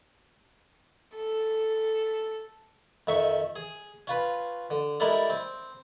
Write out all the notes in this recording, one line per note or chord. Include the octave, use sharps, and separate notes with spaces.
A4
F2 D#3 E5 C#6
G#4
C#4 F4 B4
D3
G3 G#3 E4 A4 A#4 D5
C4